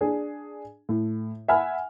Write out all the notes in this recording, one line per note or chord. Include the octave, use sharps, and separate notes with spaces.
D4 G#4
A2
E5 F#5 G#5 B5 F6